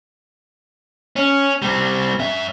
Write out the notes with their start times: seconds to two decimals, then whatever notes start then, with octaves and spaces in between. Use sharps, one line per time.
1.16 C#4
1.62 G3 C4
2.19 F#2 E5